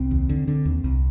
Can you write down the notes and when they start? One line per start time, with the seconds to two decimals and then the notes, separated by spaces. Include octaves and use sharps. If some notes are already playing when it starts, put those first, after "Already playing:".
Already playing: C2 C4
0.11 D#2
0.29 D3
0.48 D3
0.65 D#2
0.84 C2